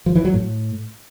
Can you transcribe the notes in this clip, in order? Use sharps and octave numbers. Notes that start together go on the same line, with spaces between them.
F3
E3
F#3
A2